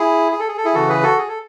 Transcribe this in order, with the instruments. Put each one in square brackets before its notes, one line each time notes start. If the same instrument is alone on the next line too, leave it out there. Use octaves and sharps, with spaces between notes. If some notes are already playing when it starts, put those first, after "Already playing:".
Already playing: [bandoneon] E4 G#4
G#4
A4
G#4
A4
E4 G#4
C#3 E3 F#4 A4
G#4 B4
F#4 A4
G#4
A4